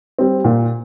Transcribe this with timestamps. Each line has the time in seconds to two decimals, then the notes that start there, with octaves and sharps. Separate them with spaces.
0.19 G3 C4
0.44 A#2